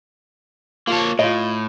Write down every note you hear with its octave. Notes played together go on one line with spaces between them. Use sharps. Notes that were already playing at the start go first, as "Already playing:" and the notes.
A#3 F4 C#5 A5
A2 F4 D#5